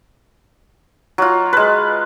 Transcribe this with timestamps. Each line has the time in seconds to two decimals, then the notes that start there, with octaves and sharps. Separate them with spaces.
1.18 F#3 F4
1.53 G#3 B4